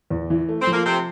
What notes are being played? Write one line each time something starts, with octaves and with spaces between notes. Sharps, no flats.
E2
E3
A3
C4
F3
A#3
C3 C4